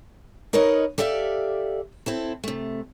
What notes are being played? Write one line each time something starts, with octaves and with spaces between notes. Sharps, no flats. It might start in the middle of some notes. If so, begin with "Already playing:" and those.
D#4 A#4 B4 C#5 D#5
G4 A4 D5 E5 F5
C4 E4 A4
C3 A3